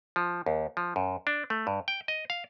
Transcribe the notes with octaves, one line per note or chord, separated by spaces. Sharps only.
F3
D#2
F3
F#2
D4
A3
G2
G5
D#5
F5